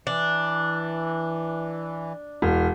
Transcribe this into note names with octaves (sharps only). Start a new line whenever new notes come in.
E3 D4
E1 F6